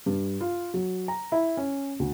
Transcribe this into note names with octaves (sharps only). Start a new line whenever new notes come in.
G2
F4
F#3
A#5
E4
C#4
D2